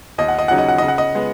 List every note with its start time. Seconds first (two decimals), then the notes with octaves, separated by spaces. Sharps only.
0.18 D#2 D#5
0.28 F#5
0.39 D#5
0.48 C#3 F#3 D#4 F#5
0.58 D#5
0.68 F#5
0.78 C#3 D#5
0.88 F#5
0.98 D#5
1.15 G#3 B3